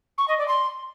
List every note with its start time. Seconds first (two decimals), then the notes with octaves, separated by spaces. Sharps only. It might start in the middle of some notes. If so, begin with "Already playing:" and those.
0.18 C#6
0.28 D#5
0.38 D5
0.48 C6